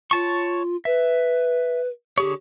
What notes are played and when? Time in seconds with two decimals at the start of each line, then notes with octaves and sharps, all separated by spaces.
0.11 F4 C#5 A5 C#6
0.85 B4 E5
2.18 D3 G4 G#4 C#5